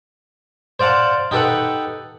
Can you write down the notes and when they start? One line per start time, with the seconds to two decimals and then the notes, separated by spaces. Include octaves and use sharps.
0.80 C5 D5 F5 F#5 A5
1.31 D#4 G4 A4 B4 F#5